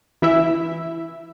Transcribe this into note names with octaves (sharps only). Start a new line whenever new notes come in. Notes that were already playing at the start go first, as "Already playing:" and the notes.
E3 E4 E5